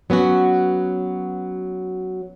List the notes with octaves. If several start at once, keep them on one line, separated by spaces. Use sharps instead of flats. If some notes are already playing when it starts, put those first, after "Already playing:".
F#3 B3 C#4 F#4